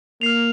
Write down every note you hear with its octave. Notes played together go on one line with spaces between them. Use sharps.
A#3 F6 C7 F7